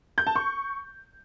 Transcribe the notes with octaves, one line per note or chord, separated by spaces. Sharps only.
G6
A5
C#6